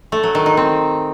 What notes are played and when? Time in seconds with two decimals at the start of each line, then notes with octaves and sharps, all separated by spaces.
0.12 A3
0.23 F#3
0.35 D#3
0.46 D#4
0.57 C4